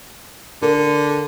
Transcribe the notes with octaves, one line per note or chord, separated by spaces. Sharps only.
D3 A#4